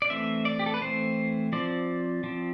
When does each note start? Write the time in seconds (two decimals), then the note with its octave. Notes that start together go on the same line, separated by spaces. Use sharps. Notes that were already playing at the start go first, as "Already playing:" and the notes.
0.02 D5
0.10 E3 A3 C4 E5
0.45 D5
0.59 G4
0.66 A4
0.74 B4
0.81 E3 A3 C4 C5
1.52 F3 C4 D5
2.24 F3 C4